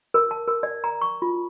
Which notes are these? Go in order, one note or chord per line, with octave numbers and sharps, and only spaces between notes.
A#4
A5
A#4
D5
A#5
C#6
F4